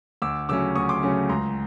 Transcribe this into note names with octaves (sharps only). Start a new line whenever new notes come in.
D2 D6 E6
C#3 F#3 A3 C#4 D6 E6
D2 C#6 D#6
C6 D6
C#3 F#3 A3 C#4
C#2 A#5 C6